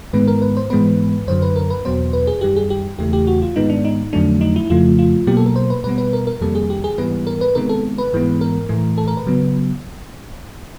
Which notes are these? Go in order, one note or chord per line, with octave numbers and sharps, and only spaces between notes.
G#2 D#3 G#3 B3 B4
A#4
B4
C5
G#2 E3 G#3 B3 B4
F#2 D3 F#3 C5
B4
A#4
B4
E2 B2 F#3 B3 C5
B4
G#4
F#2 D#3 G3 G4
G#4
G4
E2 C#3 E3 A3 G4
G4
F#4
F4
G#2 D#3 G#3 B3 D#4
D4
D#4
F2 D3 F#3 A3 D4
D#4
E4
F2 C#3 F3 A3 F4
F4
B2 F#3 A#3 G4
A4
A#4
C5
B4
B2 G3 B3 B4
B4
A#4
A#4
F2 C3 D#3 G3 A#3 A4
G#4
G4
G#4
G#2 E3 G3 B3 B4
A#4
B4
C3 D#3 G#3 B3 A#4
A4
B4
G#2 E3 G#3 B3
A#4
A2 E3 A3
A4
A#4
B4
C#3 F#3 B3